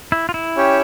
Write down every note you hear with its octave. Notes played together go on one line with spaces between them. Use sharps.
E4
F4
E4
C#4 G4 C#5 G5